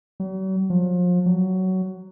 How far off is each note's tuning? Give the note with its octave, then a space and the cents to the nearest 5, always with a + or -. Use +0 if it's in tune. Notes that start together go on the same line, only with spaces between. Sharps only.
F#3 +45
F3 +35
F#3 +15